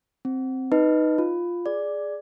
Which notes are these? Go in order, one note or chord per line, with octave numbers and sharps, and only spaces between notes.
C4
D#4 B4 D#5
F4
G#4 D5